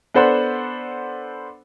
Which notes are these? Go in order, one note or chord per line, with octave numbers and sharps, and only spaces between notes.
B3 D4 A4 C5 F#5 B5